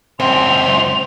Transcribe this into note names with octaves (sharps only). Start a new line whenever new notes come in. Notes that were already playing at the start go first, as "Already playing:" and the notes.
C#2 F#2 C4 C6 F7